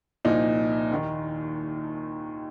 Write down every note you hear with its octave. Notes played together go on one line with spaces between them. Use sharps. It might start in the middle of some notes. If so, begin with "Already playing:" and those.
C2 A#2 F3 D#4
D#2 D#3